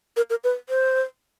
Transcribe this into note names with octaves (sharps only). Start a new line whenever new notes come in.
A#4
A#4
B4
C5